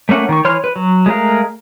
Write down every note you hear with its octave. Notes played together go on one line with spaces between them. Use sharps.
A3 A#3 C#4 F#5
D#3 C#6
E3 C#5 C6 F6
B4
F#3
G#3 A3 A#4 F5